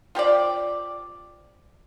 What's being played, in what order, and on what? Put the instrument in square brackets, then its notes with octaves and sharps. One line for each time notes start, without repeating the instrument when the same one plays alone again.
[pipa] F4 G4 C5 D5